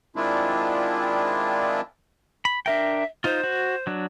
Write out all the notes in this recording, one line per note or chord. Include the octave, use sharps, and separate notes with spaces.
D#3 G#3 C4 D4 E4 F4
B5
D4 A#4 E5 G5
D#4 F4 C5
F#4
F#3 D4